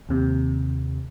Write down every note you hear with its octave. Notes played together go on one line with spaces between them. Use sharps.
D#2 C3